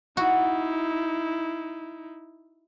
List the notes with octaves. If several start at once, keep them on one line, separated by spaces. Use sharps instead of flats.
D#4 E4 F#4